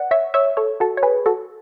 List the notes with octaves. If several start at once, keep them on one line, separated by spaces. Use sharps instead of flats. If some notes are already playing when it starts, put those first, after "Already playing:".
Already playing: B4 D5 F#5
C#5 E5
C#5 E5
A4 C#5
F#4 A4
C#5
G#4 B4
F#4 A4